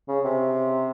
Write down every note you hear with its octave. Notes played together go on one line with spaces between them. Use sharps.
C#3
C3